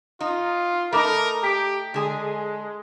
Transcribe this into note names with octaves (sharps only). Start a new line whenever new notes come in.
D#4 F4
A3 D#4 A#4 B5 D6
G4 A#5 B6 D7
D3 G#3 G#4